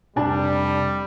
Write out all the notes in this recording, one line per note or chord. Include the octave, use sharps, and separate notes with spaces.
F1 G3 D4 A5